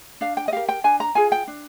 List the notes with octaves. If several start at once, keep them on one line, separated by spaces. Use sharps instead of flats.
D4 F5
G5
D#5
G4 A#4 F5
G5
D4 G#5
A#5
F4 G#4 G#5
G5
D4